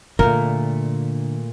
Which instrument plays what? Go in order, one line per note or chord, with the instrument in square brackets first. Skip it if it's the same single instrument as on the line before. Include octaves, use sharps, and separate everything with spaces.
[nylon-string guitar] A#2 A3 [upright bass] D3 [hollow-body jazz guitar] A#4